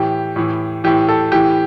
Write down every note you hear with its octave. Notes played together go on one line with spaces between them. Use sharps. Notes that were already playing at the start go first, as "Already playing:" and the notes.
Already playing: A2 E3 G4
A2 E3
A2 E3 G4
A4
A2 E3 G4